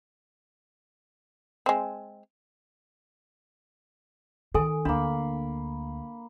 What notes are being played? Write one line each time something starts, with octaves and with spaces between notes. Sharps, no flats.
G#3 C4
D#3 A4 G#5
D2 A#3 D4 B5